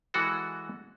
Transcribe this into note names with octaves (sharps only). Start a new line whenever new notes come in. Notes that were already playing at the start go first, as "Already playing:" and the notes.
E3 G#3 F#4 A4